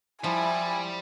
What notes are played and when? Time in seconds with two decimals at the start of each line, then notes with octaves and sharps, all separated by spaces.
0.24 F3 G3 E4 G#5